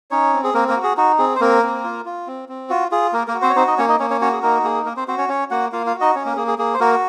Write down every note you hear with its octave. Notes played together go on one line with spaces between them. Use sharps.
C#4 D#4 C#5
C4
G#4
A#3 C4 A#4
A#3 A#4
F#4
G#4
D#4 F#4
C4 G#4
C5
A#3 C4 A#4
C4
F4
F4
C4
C4
F4 F#4
F4 G#4
A#3 A#4
A#3 A#4
F#4
C4 C5
C#5
C4 D#4 C5
D#4 D#5
A#3 C#4 C#5
D#4 D#5
A#3 C#4 C#5
C#4 C#5
C#4 F#4 C#5
G#4
A#3 D#4 A#4
A#3 G#4
A#3 A#4
C4 C5
C4 F#4 C5
C#4 C#5
C#4 C#5
A#3 F#4 F#5
A#3 F4 F5
F4 F5
F#4
D#4 D#5
C#4 C#5
A#3 A#4
A#3 G#4
G#4
A#3 G#4
C5
A#3 F#4 A#4